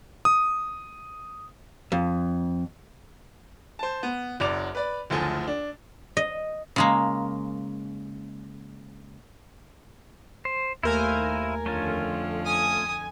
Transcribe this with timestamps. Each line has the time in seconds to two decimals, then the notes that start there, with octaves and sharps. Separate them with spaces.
0.25 D#6
1.92 F2
3.79 C5 A5
4.03 B3
4.40 F#1 F#2 D5 D6 F7
4.75 B4 D5 B5
5.10 F#1 D2 F3 A3 A4 G#5
5.47 D4
6.17 D#5
6.76 C#3 G#3 A#3
10.45 C5
10.83 D#2 A3 E4 A#4 C5 F5 G#5
11.66 F2 D3 F3 A3 C#4 F4
12.46 G#5 D#6